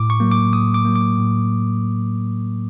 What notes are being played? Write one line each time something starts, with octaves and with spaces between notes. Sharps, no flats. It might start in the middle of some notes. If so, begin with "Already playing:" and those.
Already playing: A2 D6
C#6
F#3 A#3
D6
A2 D#6
D6
F#3 A#3
D6
A2